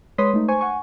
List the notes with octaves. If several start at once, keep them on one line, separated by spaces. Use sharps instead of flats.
G#3 B4 C#5 C6 D#6 B6
A3 D#4
C5 G#5 C#6
F#5 G#5 C#6